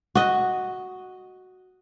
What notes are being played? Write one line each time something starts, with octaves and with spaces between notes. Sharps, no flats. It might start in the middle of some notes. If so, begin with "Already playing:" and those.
F#4 D#5